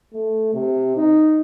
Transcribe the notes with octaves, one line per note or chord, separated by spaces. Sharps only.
A3
C3
D#4